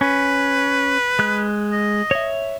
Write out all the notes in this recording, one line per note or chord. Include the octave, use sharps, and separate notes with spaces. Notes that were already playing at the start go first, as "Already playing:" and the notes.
C#4 B4
G#3 F#6
D#5
C#5 E5